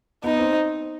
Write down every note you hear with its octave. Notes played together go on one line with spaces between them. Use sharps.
B3 D#4
C4